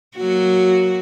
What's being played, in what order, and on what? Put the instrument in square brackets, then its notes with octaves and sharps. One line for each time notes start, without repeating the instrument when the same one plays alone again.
[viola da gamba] F#3 A#3 F#4